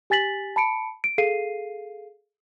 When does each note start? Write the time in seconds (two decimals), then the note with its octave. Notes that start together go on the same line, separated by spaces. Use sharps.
0.10 G4 G#5 A6 B6 F#7
0.56 A5 B5 C#7 D7
1.04 D7
1.18 G#4 A4 F5 C7 D#7